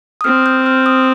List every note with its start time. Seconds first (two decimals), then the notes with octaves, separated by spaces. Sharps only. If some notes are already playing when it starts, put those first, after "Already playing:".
0.21 D#6
0.24 C4 F6
0.46 G6
0.66 F6
0.86 D#6